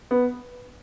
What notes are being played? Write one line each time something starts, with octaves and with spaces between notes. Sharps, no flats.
B3